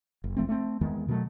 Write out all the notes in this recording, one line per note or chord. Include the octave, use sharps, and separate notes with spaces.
F#1
F#1 F3 A3 C4
A3 C4
E2 D#3 G#3 B3
B2 D#3 F#3 A3